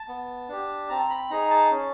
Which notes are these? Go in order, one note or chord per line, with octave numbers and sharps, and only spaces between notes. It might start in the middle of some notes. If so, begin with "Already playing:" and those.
Already playing: A5
B3
D4 G4
C4 A#5
B5
D#4 G#4 A#5
A5
C#4